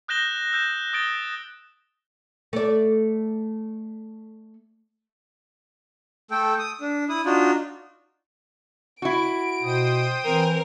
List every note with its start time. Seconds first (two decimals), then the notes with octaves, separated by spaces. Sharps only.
0.08 D#6 F#6 G6 A#6 E7 G7
0.53 E6 G6 E7
0.93 D#6 A6 D7 G7
2.53 A3 D5
6.31 A3 A4 G5
6.59 D#6
6.81 D4
7.09 E4 D#6
7.25 D4 D#4 F4 F#4
9.02 E4 F#4 D7
9.63 B2 C5 G5 D#6
10.25 E3 C4 A#4